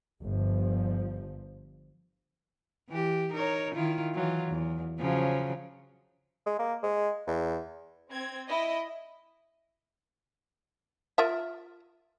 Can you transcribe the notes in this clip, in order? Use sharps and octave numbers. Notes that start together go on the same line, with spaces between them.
G1 G2 F3
E3 G4
D#4 A#4 C#5
D#3 E4 F4
E3 F#3 F4
E2
C#3 F3 F#3
G#3
A#3
G#3
E2
C4 G#6
E4 D#5
F4 A#4 E5